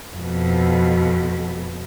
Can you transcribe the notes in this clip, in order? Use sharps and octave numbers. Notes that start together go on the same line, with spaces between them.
F2 B2